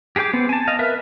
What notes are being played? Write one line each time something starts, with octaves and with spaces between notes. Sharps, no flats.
G4 G#4 A#4 G5 D6
B3 C4
G#5 A5
D#5 F5
A#4 B4 E5